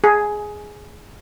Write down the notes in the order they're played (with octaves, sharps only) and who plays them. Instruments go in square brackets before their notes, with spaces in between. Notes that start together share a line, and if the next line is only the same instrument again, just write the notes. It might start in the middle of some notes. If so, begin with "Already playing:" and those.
[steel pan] G#4